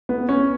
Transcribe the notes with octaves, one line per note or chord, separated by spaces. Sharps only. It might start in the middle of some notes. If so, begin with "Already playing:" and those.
B3
C#4